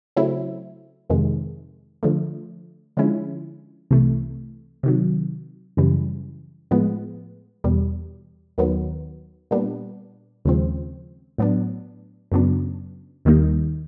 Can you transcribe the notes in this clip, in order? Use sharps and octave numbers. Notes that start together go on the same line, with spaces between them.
C#3 F#3 A3 C4 E4
F2 C3 D#3 G#3
D3 F3 A3
D3 F3 G#3 C#4 E4
C2 C3 E3 A3
C3 D#3 F#3
F#2 C#3 E3 G3
A2 F3 G#3 B3
E2 B2 G3
D#2 D#3 F#3 B3
A#2 G3 B3 D4
D#2 C#3 F3 G#3 C4
A2 F#3 B3 D4
F#2 C#3 F#3 B3 D4
D#2 D#3 G3 A#3 D#4